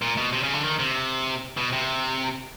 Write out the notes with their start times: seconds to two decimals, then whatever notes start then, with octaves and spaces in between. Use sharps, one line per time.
0.02 A#2
0.17 B2
0.33 C3
0.43 C#3
0.53 D3
0.64 D#3
0.79 C3
1.57 B2
1.73 C3